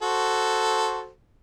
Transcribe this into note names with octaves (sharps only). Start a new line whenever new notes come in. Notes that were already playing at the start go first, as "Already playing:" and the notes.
F#4 A4 C5